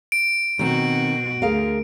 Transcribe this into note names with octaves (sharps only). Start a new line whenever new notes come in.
D7
B2 D#3 C4 F#4
D2 G#4 A#4 F5